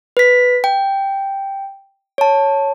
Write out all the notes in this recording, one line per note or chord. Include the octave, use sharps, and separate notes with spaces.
B4 B6
G5
C#5 A5